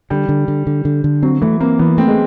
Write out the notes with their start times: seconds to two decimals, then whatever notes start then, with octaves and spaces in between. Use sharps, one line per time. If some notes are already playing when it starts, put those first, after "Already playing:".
0.10 D3 G3
0.29 D3
0.48 D3
0.67 D3
0.85 D3
1.04 D3
1.23 F#3 C4
1.41 E3 A3
1.60 A#3 C4
1.79 E3 B3
1.97 A3 C4
2.08 G#3